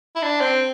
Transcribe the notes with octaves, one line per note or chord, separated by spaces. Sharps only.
E4
D4
C4